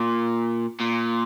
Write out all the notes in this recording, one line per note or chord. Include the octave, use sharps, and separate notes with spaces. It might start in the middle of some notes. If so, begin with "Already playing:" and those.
Already playing: A#2
A#2